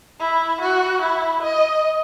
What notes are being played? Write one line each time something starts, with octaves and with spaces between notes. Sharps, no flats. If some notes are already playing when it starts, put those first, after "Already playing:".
E4
F#4
E4
D#5